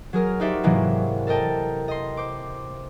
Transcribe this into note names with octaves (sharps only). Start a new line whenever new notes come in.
F#3 G#4 A#4 F6
D#4 F#4 G4 C5 D5 E5
G#2 C3 E3 F#3 G#3 A#3
A4 A#4 D#5 G5 A5
D#5 C6
C5 D6